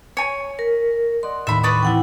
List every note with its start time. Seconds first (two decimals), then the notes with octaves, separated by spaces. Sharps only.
0.17 C#5 G#5
0.59 A#4 A#6 B6
1.23 D5 D#5 F#5 C6
1.47 D#2 A2 E5 B5
1.64 B4 D5 C#6 D#6
1.83 E3 C4 E4 F#5 G5